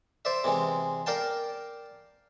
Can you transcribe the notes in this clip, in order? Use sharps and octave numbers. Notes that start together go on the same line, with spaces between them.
C5 D5 E5
C3 E3 G#3
A#4 D5 F5 G5 A5